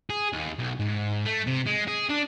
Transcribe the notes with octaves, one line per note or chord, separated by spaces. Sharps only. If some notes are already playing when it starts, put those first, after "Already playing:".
G#4
D#2
B1
G#2
A3
C3
G#3
G#4
D4